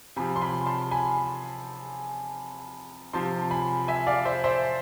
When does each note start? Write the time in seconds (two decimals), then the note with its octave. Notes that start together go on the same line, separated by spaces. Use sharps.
0.16 C3 F3 G#5 B5
0.36 C6
0.42 G#5 B5
0.66 A5 C6
0.91 G#5 B5
3.13 C3 F3 A5 C6
3.51 G#5 B5
3.88 E5 G#5
4.07 D5 F5
4.25 C5 E5
4.44 C5 E5